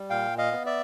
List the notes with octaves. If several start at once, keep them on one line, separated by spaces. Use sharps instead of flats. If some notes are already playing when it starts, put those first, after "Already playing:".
Already playing: G3
A#2 F5 G5
D#5 F5
B3
D5 E5